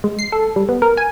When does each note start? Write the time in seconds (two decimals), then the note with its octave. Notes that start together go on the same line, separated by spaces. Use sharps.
0.04 G#3
0.19 C7
0.32 A4
0.56 G3
0.69 B3
0.82 A#4
0.97 G#5